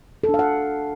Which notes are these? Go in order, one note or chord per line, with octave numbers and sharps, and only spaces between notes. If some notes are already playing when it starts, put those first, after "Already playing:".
A4
D4
F5
F#5